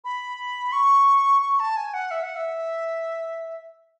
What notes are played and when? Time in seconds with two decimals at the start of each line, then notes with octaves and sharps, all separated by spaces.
0.05 B5
0.72 C#6
1.42 C#6
1.60 A5
1.77 G#5
1.94 F#5
2.11 E5
2.23 F#5
2.36 E5